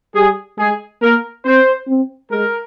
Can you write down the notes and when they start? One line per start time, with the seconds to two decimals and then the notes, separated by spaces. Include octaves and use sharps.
0.15 G3 G#4
0.58 G#3 G#4
1.01 A#3 A#4
1.45 C4 C5
1.87 C4
2.31 G#3 A#4